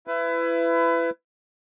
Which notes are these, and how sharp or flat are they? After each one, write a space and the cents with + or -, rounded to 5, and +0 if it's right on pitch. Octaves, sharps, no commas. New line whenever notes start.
E4 +25 B4 +25